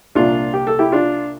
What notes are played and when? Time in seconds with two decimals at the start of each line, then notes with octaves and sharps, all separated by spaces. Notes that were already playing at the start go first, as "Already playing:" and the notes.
0.15 C2 A#2 D4 F4
0.54 G4
0.67 A4
0.79 E4 G4
0.92 D4 F4